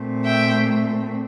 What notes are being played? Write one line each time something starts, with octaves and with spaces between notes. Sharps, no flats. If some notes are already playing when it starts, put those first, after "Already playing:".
Already playing: A#2 A3 C4
E5 G5